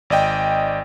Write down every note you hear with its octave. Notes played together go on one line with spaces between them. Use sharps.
G#1 D5 D#5 G5